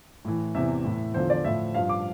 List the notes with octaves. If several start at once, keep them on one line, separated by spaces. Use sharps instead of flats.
A2 E3
E2 C3 E3 E5
A2 E3
E2 D3 F3 C5
D5
A2 F3 E5
G2 F3 F5
D6